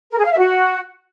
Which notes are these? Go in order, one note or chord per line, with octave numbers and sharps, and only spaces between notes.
A#4
G#4
F5
E5
F#4